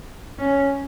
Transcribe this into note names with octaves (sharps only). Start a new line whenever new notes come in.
C#4